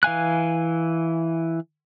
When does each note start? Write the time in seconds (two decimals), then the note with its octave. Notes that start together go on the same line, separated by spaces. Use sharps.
0.03 E3 F5 G#5 F#6